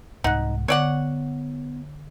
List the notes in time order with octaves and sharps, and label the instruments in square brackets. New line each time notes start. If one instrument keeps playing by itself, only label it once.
[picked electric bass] C2 G#2 [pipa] D#4 [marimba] F#5 F#6
[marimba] D3 [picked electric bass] B3 [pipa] C#5 D5 F#5